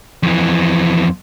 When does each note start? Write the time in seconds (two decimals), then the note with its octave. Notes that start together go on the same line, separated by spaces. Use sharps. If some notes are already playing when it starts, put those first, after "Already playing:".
0.23 F2 E3